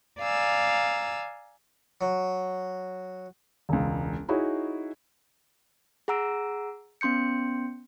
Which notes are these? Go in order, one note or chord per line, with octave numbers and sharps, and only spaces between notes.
D5 F5 G#5 A#5 E6
F#3
E1 C#2
D#4 E4 F#4 G#4 C#5
G#4 F#5 A#5 E6 D7
B3 C#4 C6 G6 C#7